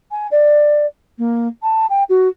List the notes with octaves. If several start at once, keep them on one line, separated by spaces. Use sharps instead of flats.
G#5
D5
A#3
A5
G5
F#4